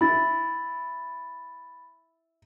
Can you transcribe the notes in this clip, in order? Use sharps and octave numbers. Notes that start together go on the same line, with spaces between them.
E4 B5 A6